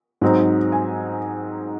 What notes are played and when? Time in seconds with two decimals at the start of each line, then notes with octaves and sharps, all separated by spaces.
0.21 G#2 F#3 C4 D#4
0.72 G#5